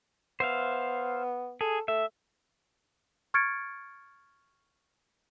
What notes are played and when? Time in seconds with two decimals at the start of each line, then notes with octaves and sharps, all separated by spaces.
0.40 B3 C5 E5 F5
1.61 G#4 A4
1.88 A3 E5
3.34 C#6 F6 G#6 A6 C#7 D7